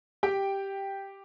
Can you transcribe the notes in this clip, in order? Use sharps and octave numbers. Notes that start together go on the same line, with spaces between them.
G4 G5